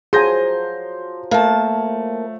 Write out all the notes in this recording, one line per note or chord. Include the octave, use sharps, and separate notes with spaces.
F3 F#3 G#4 C5 G#5 C6 G6 A#6
A3 A#3 A5